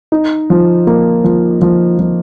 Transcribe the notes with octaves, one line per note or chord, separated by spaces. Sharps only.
D#4
F3
A#3
F3
F3
F3